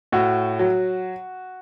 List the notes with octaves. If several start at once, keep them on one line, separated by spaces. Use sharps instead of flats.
A2 F#4
F#3